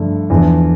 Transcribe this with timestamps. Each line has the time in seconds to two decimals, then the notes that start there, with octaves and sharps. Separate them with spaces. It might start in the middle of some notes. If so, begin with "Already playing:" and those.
Already playing: G2 D3 F3 A3
0.30 E2 D3 F3